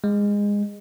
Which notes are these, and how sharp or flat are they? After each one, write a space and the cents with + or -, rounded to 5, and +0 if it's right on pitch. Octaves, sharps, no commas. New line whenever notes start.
G#3 -20